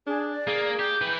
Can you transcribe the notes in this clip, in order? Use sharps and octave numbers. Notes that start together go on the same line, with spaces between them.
D4 G#4
D5
A#3 G#4
G4 G6
E3 B4